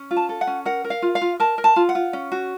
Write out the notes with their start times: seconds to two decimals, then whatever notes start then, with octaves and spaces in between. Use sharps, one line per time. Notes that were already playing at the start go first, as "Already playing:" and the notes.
Already playing: C#4
0.11 F4
0.17 A5
0.29 A4
0.41 F#5
0.47 C#4
0.66 A#4 F#5
0.84 A#4
0.90 F5
1.02 F4
1.15 F5
1.21 F4
1.40 A#4 A5
1.58 A#4
1.64 A5
1.76 F4
1.89 F#5
1.95 F4
2.13 C#4
2.32 F#4